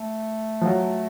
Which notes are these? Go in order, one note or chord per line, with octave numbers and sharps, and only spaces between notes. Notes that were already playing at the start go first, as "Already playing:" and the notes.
Already playing: A3
F3
F#3